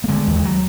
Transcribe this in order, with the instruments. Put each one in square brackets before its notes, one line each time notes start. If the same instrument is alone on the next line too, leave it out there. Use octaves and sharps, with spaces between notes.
[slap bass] A#3
D3 G#3
D#2
G#3
F#3